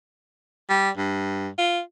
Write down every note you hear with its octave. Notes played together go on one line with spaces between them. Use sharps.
G3
G2
F4